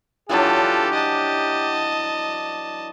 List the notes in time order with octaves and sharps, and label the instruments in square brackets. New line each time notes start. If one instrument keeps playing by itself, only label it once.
[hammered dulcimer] E3 F#3 D4 [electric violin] F4 A4 [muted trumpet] G4
[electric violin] D#5 A5